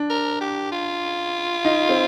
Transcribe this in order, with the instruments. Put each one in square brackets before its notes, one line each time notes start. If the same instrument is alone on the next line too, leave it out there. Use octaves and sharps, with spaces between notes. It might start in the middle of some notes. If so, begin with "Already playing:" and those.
Already playing: [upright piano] D4
[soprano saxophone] A#4
G4
F4
[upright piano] D#4
C4